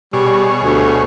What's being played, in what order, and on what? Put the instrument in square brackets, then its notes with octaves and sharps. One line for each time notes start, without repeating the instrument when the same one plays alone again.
[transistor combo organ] B2 G#4 C#5 [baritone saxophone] G3
[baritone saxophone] D2